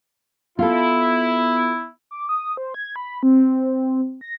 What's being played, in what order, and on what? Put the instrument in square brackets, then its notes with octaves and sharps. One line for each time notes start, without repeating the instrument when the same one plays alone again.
[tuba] B3 [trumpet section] E4 [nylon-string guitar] F4 A4
[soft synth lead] D6
D#6
C5
G#6
B5
C4
A#6